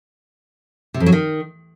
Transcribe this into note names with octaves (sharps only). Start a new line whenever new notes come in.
C3
F2
F#3
D#3